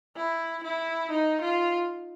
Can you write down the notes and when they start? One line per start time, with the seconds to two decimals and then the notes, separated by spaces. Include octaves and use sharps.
0.16 E4
0.63 E4
1.10 D#4
1.41 F4